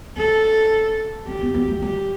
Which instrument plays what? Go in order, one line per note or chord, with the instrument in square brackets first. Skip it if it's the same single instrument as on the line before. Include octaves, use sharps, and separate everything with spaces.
[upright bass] C#4 [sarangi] A4
[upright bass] C#4 [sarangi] G4
[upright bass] B3
B3
A3
[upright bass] G3 [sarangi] G4